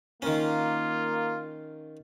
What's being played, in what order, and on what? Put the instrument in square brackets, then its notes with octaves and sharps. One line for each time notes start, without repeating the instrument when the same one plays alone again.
[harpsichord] D#3 C#4 [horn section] A#3 F4